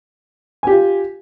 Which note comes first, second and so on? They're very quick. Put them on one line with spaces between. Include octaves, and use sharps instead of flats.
G#5 G4 F4